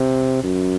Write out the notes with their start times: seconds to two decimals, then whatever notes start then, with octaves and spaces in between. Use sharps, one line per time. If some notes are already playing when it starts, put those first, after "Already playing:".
Already playing: C3
0.44 F#2